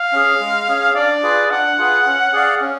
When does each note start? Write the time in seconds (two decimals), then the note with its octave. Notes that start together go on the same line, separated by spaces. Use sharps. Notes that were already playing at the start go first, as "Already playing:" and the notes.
Already playing: F5
0.12 C#4 G#4
0.40 G#3
0.68 C#4 G#4
0.96 D4 D5
1.23 F4 G#4 B4
1.51 D4 F#5
1.77 F4 G#4 B4
2.06 C#4
2.33 G#4 D5 F5
2.61 C#4